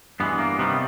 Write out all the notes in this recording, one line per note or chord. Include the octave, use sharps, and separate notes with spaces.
G2 E3 G#3 B3
A#3
C3 D#3 G3 B3